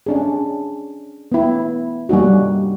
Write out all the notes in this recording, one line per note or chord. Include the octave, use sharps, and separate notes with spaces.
C#4 D4 G#4
B3 E4
G3 A#3 D#4 F#4